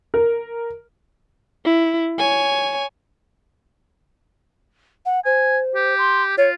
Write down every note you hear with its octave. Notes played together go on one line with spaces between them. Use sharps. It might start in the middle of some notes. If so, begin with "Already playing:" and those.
A#4
E4
C#5 G#5
F#5
C5 G#5
G4
C6
F4 C#5